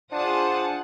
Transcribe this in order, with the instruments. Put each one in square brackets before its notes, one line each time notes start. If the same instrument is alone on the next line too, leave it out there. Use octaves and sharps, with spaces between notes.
[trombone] D4 [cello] F4 F#5 [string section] G#4 A5 D#6 [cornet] C5